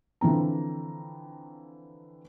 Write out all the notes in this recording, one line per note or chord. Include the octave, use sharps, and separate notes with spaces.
D3 E3 F3 C4 A#5